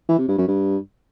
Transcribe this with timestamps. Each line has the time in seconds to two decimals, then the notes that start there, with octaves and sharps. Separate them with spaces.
0.09 E3
0.19 C3
0.28 G2
0.38 F#2
0.48 G2